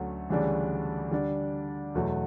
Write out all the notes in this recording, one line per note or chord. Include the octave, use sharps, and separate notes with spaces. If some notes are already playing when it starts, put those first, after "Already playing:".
Already playing: D2 D3 F#3 A3 C#4
D2 C#3 E3 G3 D4
D3 G3 D4
E2 B2 F#3 A3